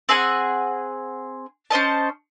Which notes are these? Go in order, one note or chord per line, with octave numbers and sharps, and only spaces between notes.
C4 G#4 F#5 G#5
C#4 C5 D#5 A5